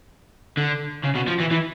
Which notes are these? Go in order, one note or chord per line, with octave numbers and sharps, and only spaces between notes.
D3
C#3
B2
F3
E3
E3